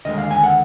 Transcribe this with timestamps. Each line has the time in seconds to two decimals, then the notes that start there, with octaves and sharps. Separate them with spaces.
0.05 D#2 D3 G#3 D#5
0.18 F5
0.31 G#5
0.44 F#5